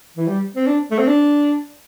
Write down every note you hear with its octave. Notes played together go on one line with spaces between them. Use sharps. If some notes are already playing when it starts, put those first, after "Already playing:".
E3
G3
C4
D4
A3
C4
D4